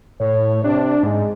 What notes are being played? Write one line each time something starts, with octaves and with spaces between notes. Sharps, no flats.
A2 C#5
C3 D4
G#2 G#3